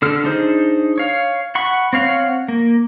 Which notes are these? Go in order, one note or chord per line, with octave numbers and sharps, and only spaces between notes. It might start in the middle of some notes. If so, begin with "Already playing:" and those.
D3 A4 F6
D4 D#4 G#4 C5
C#5 F5
F#5 B5 C#6
C4 C#5 F5 F#5
A#3